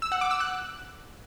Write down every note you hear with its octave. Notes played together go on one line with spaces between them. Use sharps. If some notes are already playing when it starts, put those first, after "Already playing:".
E6
F#5
D6
E6
F#6